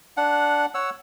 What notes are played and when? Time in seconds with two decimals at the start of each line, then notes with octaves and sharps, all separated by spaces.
0.17 D4 F#5
0.74 C#5 F#5 E6